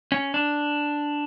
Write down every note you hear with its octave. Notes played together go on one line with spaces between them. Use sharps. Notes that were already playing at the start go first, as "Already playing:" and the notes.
C#4
D4